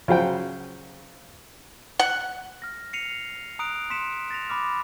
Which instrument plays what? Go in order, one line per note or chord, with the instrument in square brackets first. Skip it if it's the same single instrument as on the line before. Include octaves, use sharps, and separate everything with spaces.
[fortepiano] C#3 F#3 C5 G5
[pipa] F#5
[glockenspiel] F6 A#6
C7 C#7 D#7 F7
A#5 D#6 F#6 D7 F7
C6 B6 C#7 E7
A6 A#6 F7
B5 D6 F6